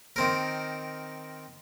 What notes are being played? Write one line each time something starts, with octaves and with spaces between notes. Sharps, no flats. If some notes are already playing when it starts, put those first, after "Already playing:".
D#3 C4 A#4